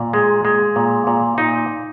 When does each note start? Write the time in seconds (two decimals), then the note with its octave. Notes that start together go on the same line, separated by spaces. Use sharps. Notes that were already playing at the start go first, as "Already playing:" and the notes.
Already playing: A#2
0.13 G#3
0.45 G#3
0.76 A#2
1.07 A#2
1.38 A#2 D#4